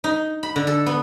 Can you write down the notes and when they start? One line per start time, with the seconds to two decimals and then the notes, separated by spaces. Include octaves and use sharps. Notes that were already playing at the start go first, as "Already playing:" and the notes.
0.04 D#4
0.43 B5
0.56 D3
0.67 A4
0.86 B3